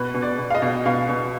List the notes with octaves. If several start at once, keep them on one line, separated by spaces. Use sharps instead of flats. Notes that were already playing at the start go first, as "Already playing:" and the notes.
Already playing: B2 B4
B2
D5
B2
F5
D#5
B2
B2 F5
B2